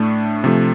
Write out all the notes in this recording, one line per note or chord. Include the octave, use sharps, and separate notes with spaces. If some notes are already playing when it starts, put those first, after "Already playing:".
Already playing: A2 A3 D4
C3 F3 A3